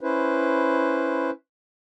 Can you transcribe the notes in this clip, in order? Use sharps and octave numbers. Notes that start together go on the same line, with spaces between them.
C#4 E4 B4 C5